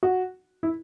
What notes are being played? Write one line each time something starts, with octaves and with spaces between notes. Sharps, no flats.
F#4
E4